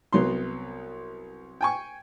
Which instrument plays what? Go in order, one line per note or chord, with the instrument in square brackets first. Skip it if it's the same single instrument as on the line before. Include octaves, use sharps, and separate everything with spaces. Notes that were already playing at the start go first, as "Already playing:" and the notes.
[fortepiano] C2 F#3 B3 C6
G5 G#5 C#6